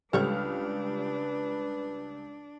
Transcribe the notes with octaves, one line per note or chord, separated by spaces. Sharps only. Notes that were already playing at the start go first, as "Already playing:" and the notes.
C#2 G3 D4 A4 B4 C#5 G5 F6